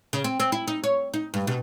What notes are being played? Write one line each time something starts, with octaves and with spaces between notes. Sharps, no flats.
C#3
C4
C4
E4
D#4
C#5
D#4
G2
B2